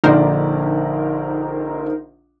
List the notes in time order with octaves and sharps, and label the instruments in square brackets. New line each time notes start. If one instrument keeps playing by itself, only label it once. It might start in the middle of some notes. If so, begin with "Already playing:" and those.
[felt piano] A#1 D3 D5 [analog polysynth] D#4 A#4 C5